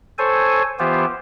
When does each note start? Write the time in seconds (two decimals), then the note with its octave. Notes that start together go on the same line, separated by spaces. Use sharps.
0.18 A4 C5 C#5 G#5
0.79 E3 B3 F4 G4 C5